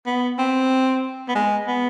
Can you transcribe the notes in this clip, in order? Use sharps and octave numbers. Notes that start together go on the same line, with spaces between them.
B3
C4
B3
G#3
B3